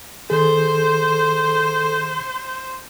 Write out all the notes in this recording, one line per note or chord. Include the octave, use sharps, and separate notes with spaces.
D#3 G#4 A4 C5